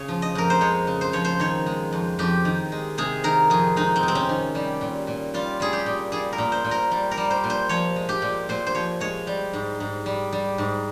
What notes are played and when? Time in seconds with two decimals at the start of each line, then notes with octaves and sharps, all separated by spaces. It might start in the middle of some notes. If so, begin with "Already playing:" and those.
Already playing: C#3 C#5
0.08 F3
0.22 D#5
0.35 F2 A#4
0.50 C5
0.61 G#3 C#5
0.87 C#3
1.01 C5
1.13 F3 C#5
1.25 C5
1.40 D#3 C#5
1.66 G#3
1.93 F2
2.19 F2 G4
2.45 D#3
2.72 G#3
2.98 C3 G#4
3.24 D#3 A#4
3.50 F2 G#4
3.76 G#3 D#4
3.96 C4
4.03 C3
4.08 C4
4.15 C#4
4.29 D#3
4.55 G3
4.81 A#2
5.07 A#2
5.34 G3 F4
5.60 G3 G#4
5.73 G4
5.86 A#2
6.12 G3 G#4
6.33 A#4
6.38 A#2
6.52 C5
6.64 A#2
6.71 A#4
6.91 G3
7.11 A#4
7.17 G3
7.30 C5
7.44 A#2
7.50 C5
7.69 F3 C#5
7.96 G#3
8.09 G4
8.22 A#2
8.49 A#2 C5
8.66 C5
8.75 F3 C#5
9.00 G#3 C#5
9.27 G3
9.53 G#2
9.80 G#2
10.06 G3
10.32 G3
10.58 G#2